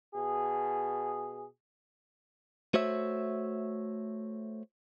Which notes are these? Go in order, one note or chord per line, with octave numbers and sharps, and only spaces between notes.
B2 G#4
A3 F#4 C5 C#5 E5